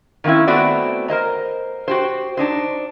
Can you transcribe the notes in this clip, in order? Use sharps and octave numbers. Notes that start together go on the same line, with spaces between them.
D#3 A#3 C4 C#4 E4
A3 B3 C4 F#4 D5
A#4 C5 D#5 A#5
F#4 G4 C5
D4 D#4 C5